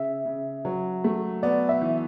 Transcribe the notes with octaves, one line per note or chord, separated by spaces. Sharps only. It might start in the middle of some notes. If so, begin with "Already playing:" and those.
Already playing: C#3 E5
C#3
F#3
A3
B3 D5
E5
E3